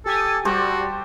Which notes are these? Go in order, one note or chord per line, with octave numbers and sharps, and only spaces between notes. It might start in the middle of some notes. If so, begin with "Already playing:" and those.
G4 A4 G#5 D#6
G3 F#4 G4 A4 C5